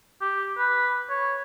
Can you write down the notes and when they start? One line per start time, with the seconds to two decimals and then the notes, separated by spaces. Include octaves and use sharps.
0.21 G4
0.58 B4
1.10 C#5